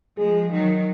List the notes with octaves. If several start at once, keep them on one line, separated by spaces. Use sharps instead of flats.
F3 G#3 G#4
D#3 F#3